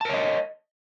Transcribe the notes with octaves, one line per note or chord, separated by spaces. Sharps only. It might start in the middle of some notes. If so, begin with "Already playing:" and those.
A#4 C#5 D#5 A5